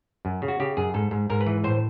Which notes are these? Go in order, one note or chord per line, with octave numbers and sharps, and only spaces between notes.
F#2
C#3
F#4
C#3 G4
F#2 G#4
G#2 A4
G#2
G#2 A#4
B4
E3
A2 C5